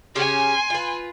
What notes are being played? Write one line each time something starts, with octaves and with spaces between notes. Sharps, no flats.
C#3 C#4 G4 G#5 C6
F4 B4